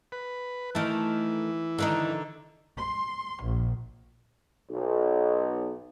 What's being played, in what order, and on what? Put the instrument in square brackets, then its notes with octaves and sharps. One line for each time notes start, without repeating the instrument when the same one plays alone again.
[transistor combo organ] B4
[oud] D#3 A3 [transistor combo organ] E3
[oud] D3 D#3 D#4
[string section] C6
A#1
[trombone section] B1